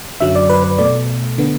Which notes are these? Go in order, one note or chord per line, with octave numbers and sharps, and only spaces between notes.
F#2 D3 F#3 E5
D5
B4
B4
B2 A3 D5
D3 B3